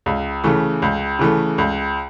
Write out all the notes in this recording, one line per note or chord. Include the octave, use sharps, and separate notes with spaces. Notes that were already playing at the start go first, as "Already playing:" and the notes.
C#2
C#3 E3 A3
C#2
C#3 E3 A3
C#2